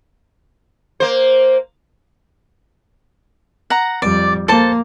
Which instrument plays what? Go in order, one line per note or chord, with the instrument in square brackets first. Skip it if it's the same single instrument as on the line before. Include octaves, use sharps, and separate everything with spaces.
[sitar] A#3 C5
[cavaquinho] F#5 A#5
[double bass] F2 G3 [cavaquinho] D5
[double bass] A#3 [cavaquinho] A4 C5 A5